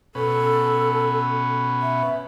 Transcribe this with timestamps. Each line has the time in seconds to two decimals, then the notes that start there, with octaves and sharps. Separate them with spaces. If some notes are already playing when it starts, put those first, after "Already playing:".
0.15 B2 C#4 A4 B4
1.82 E5